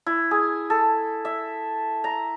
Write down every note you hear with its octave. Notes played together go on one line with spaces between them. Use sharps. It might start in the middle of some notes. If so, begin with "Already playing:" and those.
E4
G#4
A4
E5
A#5